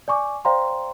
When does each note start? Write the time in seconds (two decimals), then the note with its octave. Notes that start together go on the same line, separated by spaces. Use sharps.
0.08 D5 G#5 C#6 D6
0.45 C5 D5 F5 G5 A#5 C6